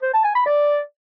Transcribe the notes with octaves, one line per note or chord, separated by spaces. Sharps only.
C5
A5
G#5
B5
D5